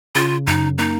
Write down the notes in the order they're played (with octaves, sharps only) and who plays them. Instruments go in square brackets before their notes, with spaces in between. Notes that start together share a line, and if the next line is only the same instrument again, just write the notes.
[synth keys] C#3 [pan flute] F4
[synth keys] F#2 [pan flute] D#4
[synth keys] A#3 [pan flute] D#4